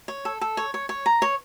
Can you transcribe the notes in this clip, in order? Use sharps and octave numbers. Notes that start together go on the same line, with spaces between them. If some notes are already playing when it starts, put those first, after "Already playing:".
C#5
A4
A4
C#5
C#5
C#5
A#5
C#5